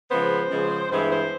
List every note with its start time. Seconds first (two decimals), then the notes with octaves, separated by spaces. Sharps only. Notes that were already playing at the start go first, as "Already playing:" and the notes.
0.10 C#3 F3 G#3 B3 C5
0.50 C#3 F3 G#3 B3
0.90 G2 E3 G#3 B3 C5
1.10 C5